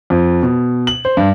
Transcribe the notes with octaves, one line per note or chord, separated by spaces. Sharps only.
F2
B2
F#7
C5
G2